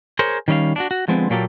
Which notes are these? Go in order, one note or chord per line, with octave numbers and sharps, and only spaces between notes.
G#4 A#4 C5 C#5
D#3 G3 C#4 D#5 F5
D4 F4 F#4
F#4
D3 F3 G#3 B3 C4
A#2 F#3 A#3 F4 G4 A4